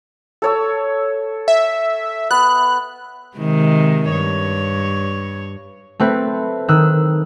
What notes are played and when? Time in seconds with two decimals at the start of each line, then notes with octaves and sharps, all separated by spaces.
0.42 A4 C#5 E6
1.48 E5
2.31 B3 F#6
3.37 C3 D#3 G#3
4.11 G2 C#5
6.00 A3 C4 B4
6.68 D#3 E6 F#6